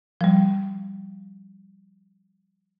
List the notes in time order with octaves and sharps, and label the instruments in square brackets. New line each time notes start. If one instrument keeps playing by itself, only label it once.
[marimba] F3 G3